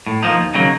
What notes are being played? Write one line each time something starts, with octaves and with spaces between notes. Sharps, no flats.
A2
F3 A#3 D#4
D#2
C#3 F#3 A#3 D#4